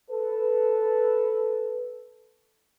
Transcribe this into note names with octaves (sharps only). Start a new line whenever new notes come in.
A4 B4